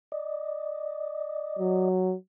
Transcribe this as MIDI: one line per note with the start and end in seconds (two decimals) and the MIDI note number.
0.12 1.88 74
0.12 1.88 75
1.59 2.14 54